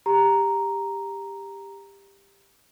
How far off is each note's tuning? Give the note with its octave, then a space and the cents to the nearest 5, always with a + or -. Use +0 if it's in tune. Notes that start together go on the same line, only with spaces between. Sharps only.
G4 +15 A#5 +0